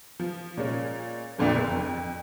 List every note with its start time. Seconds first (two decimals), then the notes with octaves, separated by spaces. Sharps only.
0.19 F3
0.57 A#2 G#3 C#4
1.38 G1 F2 A#2 D3 D5 E5
1.56 F#1
1.70 F2